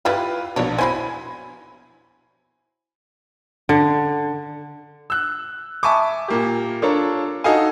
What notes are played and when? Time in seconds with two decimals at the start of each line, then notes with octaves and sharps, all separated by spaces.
0.05 E3 G3 E4 F4 G4 B4
0.56 A#1 B2 D4 C#5
0.78 F#3 E4 C5 G#5 B5
3.69 D3
5.10 E6 F#6
5.83 E5 G#5 A5 B5 C#6 D6
6.28 A#2 A#3 G4
6.82 D4 F4 A4 A#4 C#5
7.44 D#4 F#4 A4 D#5 F5 G#5